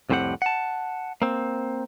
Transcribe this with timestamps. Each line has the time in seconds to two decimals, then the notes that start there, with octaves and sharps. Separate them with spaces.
0.10 C2 F2 A2 C4 G4 F#5
0.42 F#5 A5
1.22 A#3 C4